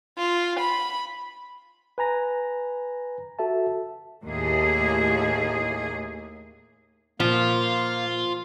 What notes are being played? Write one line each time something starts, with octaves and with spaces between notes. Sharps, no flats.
F4
B5
B4 G#5 A#5 A#6
F#4 A4 E5 A5
D#2 A2 G#4
A#2 F3 A#3 F4